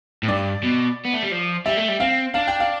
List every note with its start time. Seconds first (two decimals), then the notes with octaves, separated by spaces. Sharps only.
0.23 A2
0.28 G2 D5
0.63 B2
1.05 B3
1.13 A3
1.23 G3
1.31 F3
1.66 G3 E5
1.77 A3
1.88 G3
2.00 C4 F5
2.34 D4 F5
2.48 G5
2.60 F5